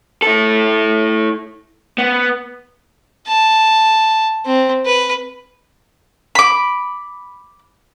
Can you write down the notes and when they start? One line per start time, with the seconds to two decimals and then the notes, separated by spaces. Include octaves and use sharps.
0.22 E4 A4
1.98 B3
3.27 A5
4.46 C4
4.86 B4
6.35 B5 D6